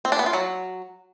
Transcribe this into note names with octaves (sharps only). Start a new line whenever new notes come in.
C4
D4
B3
F4
F#3